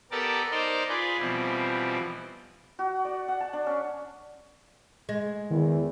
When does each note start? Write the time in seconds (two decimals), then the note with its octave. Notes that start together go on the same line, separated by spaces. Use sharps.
0.11 B3 G4 A4 A#4 D5 A5
0.51 D#4 A#4 C5 D5 D#5 G5
0.89 F4 G#4 B4 D5
1.19 B2 E3 F3 G3 C4
2.79 F#4
3.05 D5
3.28 F#5
3.41 A5
3.53 D4
3.66 C#4
5.09 G#3
5.50 E2 D#3 E4